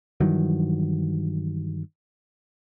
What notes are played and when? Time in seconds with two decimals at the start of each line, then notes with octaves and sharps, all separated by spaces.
0.20 G2 D#3 E3 F#3